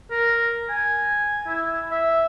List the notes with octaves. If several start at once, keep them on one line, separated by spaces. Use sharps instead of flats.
A#4
G#5
E4
E5